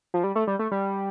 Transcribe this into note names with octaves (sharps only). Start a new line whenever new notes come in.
F3
G3
A3
G3
A3
G3